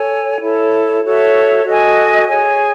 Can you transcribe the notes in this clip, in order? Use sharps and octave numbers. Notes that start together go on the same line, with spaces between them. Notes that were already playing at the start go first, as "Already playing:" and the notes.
Already playing: A4 C#5 G#5
E4 A4 C#5
F#4 A4 C#5 E5
F#4 A4 D#5 G#5
G#4 C#5 G#5